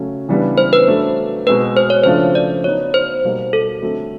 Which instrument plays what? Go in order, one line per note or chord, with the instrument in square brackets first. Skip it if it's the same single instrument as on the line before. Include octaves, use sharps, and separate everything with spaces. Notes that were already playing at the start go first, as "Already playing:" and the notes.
Already playing: [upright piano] C#3 F#3 A3 C#4
C#3 E3 G3 B3 D4
[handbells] C5
B4
[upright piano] F#3 A3 D4
[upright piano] B2 G#3 C4 [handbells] B4
[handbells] C5
C#5
[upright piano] C#3 F3 A3 D4 F4 [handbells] C5
[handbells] D5
[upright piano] F#3 B3 D#4 [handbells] C#5
[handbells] C5
[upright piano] B2 G3 A#3 D#4
[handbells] A4
[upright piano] D3 F#3 A3 C4